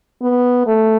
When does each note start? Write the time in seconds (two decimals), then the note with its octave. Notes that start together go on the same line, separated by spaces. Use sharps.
0.22 B3
0.67 A3